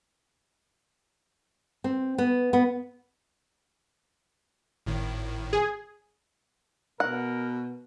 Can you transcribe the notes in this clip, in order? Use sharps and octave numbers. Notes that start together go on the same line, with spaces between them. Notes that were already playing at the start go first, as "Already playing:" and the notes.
C4
B3
B3
G#1 A2 D#3
G#4
B2 A#4 F#5